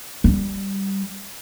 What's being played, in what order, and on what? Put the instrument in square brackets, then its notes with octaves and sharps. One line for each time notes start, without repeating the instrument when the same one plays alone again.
[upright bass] G3